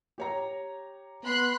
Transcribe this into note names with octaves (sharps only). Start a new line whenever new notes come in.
G4 C#5 A#5
B3 B5 C6 F#6